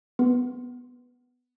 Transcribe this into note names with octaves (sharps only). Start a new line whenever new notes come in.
B3